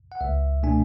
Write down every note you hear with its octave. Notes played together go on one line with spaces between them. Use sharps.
F#5
C#2 E5
B2 A3 D4 G#5